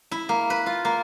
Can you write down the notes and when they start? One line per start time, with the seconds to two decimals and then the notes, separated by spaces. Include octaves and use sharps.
0.11 E4
0.29 A#3
0.50 B4
0.66 F4
0.85 A#3